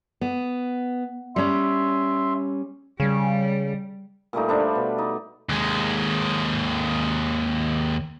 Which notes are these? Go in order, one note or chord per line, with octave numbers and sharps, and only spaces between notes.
B3
G3 C#4 E5 C6
C#3 G3
A#2 G3 A3 D#4
D4 C5 F5 B5
B2
D#4
D#2 G#3